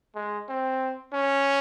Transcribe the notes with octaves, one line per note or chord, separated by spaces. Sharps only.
G#3
C4
C#4